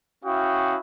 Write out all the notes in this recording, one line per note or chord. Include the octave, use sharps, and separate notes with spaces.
C#4 E4 F#4 F5 G5 D#6